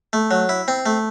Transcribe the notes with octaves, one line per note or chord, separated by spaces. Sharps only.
A3
F#3
E4
C4
A3